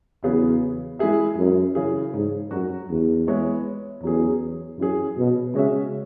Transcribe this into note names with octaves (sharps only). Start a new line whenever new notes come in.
E2 C#3 F#3 B3 G#4
E3 G#3 E4 G#4 E5
F#2
C#3 E3 C#4 G#4
G#2
F#2 F#3 C#4 F#4
E2
G#3 B3 E4 C#5
E2 F#3 C#4 G#4
F#2 E3 C#4 G#4
B2
C#3 G#3 C#4 F#4 E5